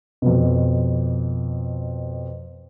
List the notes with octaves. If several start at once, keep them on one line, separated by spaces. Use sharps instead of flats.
F2 B2